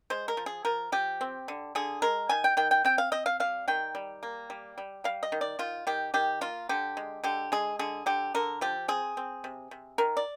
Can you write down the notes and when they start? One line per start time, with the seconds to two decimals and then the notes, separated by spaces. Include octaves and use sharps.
0.10 G#3 C5
0.28 A#4
0.37 F3
0.46 G#4
0.65 F3 A#4
0.92 F3 G4
1.21 C4
1.48 D3
1.75 D3 G#4
2.02 G#3 A#4
2.29 D#3 G#5
2.44 G5
2.57 D#3 G5
2.71 G5
2.85 C4 G5
2.98 F5
3.12 C4 D#5
3.26 F5
3.40 G3 F5
3.68 D#3 G5
3.95 G3
4.23 A#3
4.50 G3
4.78 G3
5.04 G3 F5
5.23 D#5
5.32 D#3
5.41 D5
5.59 D#3 F4
5.87 D#3 G4
6.14 D#3 G4
6.41 A#3 F4
6.69 D3 G4
6.97 G#3
7.24 D3 G4
7.52 G#3 G#4
7.79 D3 G#4
8.06 D3 G4
8.34 D3 A#4
8.61 F3 G4
8.88 C4 G#4
9.17 C4
9.44 C3
9.71 C3
9.98 D#3 A#4
10.17 D5